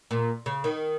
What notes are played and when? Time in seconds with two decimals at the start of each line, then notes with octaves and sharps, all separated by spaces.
0.11 A#2
0.46 C#3
0.64 D#3